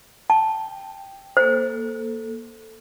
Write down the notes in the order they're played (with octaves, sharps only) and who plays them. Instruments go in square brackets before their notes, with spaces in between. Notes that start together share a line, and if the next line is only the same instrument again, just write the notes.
[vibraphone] G5 [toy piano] A5
[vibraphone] A#3 A4 [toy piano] C5